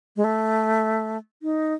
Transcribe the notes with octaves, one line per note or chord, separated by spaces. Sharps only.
G#3
A3
D#4